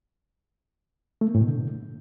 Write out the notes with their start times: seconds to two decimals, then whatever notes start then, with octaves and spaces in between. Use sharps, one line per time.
1.21 A3
1.28 A#3
1.35 A2
1.41 B2
1.48 D3